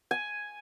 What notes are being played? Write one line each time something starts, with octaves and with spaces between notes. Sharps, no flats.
G#5